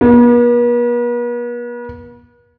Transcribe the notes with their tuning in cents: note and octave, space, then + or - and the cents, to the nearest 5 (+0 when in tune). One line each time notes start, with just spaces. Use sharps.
B3 -45